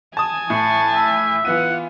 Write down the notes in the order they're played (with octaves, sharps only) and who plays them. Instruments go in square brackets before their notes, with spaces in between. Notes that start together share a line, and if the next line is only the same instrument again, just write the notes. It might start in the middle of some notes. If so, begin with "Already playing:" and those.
[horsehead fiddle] G#5 [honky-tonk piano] A5 D#6
[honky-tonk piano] A2 [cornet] A5 [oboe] C#6
[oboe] E5
[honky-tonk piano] E3 B3 D#7 [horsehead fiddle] F4 [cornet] F#5